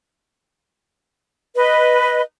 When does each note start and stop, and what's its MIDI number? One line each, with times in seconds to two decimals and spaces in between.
1.55 2.21 71
1.55 2.21 75